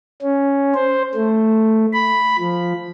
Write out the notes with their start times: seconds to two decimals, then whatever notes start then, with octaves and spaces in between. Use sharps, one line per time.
0.22 C#4
0.74 C5
1.15 A3
1.93 B5
2.39 F3